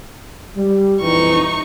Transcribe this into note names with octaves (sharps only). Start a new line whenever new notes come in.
G3
A#1 F2 E3 D#4 C#6